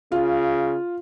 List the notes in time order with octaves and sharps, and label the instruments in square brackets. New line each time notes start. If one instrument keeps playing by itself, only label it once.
[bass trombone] C#3 [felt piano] F4